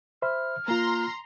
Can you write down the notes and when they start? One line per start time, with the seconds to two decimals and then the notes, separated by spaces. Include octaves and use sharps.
0.22 C5 E5 B5 F6
0.68 A#3 F4 A#5 C6